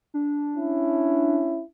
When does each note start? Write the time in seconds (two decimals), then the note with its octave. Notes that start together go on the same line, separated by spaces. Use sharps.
0.14 D4
0.57 C#4 E4